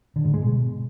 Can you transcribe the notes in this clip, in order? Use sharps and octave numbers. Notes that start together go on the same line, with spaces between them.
D3
G#2
G#3
B2